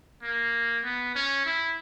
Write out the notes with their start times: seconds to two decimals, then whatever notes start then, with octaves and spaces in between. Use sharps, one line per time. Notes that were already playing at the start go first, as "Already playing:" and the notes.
0.23 A#3
0.84 B3
1.15 C#4
1.46 E4